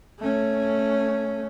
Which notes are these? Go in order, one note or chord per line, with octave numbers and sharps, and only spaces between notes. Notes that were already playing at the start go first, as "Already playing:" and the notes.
A3 C#4